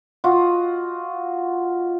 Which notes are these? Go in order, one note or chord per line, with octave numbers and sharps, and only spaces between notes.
F4 F#4 D#5 F#5